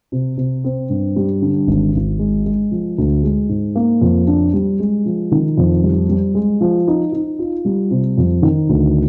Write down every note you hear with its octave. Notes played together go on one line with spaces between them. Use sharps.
C3
C3
C4
G2
G3
D3
G#1
G#1
G#3
G#3
F3
D2
G#3
G#2
A#3
F2
D4
G3
G#3
F3
D#3
F2
G3
G3
G#3
F3
D#4
D#4
F4
G3
C3
F2
D#3
D2